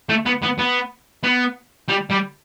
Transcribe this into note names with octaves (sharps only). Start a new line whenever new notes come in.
A3
B3
B3
B3
B3
G3
G3